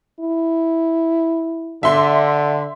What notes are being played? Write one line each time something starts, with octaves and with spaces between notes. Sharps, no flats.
E4
D3 E5 C6